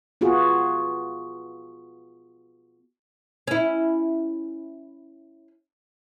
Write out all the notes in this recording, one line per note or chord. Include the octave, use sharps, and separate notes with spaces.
B3 F4 F#4 G#4
C#4 E4